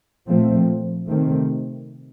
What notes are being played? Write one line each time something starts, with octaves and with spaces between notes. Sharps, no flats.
A#2 F3 A3 C4
C3 D#3 A3 C4